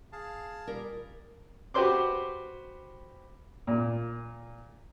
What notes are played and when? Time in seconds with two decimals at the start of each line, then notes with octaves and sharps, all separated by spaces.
0.12 G#4 F5 A5
0.67 G3 F4 A#4
1.74 F#4 G4 B4 C5 C6 D6
3.67 A#2